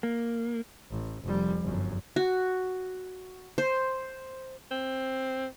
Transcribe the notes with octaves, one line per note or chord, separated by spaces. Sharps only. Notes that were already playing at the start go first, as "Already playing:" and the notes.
A#3
A1
F1 G3
G1 F#2
F#4
C5
C4